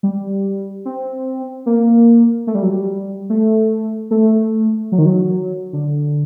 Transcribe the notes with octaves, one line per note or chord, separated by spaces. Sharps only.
G3
C4
A#3
A3
G3
F#3
G3
A3
A3
F#3
D#3
F#3
D3